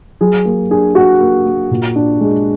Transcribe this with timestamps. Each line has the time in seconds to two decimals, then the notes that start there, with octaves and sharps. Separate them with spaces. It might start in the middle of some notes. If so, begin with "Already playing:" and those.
0.21 F#3 G#4
0.45 A#3
0.70 D4 G#4
0.95 A#3 F#4
1.20 A#3
1.46 A#3
1.71 A#2
1.96 D4
2.21 G#3